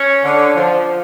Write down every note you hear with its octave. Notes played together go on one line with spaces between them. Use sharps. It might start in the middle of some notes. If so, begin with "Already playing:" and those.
Already playing: C#4
D3
F3